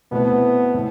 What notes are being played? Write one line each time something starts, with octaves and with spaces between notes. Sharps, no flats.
B2 A3 B3 C4 E4 B4
A2